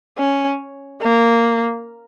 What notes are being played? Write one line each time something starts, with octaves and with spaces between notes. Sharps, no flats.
C#4
A#3